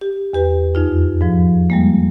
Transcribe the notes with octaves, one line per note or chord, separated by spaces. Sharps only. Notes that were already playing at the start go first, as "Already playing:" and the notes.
G4
E2 G4 B4
F2 D#4 F4
G#2 F3
G3 G#3 A#3